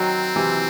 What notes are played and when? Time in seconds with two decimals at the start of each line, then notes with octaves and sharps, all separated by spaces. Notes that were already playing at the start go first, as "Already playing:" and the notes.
Already playing: D#3 F#3 C4
0.36 C3 E3